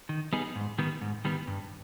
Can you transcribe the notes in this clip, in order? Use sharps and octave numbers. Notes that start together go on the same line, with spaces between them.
D#3
G3 B3 D#4 G#4
G#2
D#3 G3 B3
G#2
D#3 G3 B3
G2